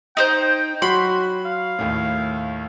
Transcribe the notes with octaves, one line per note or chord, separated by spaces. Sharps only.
D#4 C5 G5 G6
F#3 F#4 B5 C6
F5
D#2 A2